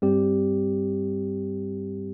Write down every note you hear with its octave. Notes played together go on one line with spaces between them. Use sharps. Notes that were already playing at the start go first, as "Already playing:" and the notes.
G2 G3 C4 G4